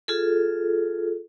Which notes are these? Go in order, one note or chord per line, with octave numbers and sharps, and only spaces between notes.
F4 G#4 A4